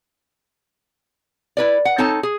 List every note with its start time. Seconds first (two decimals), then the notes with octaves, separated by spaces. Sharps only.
1.57 E4 B4 D5
1.85 F#5
1.98 C4 D#4 A4 C#5 A5
2.23 G#4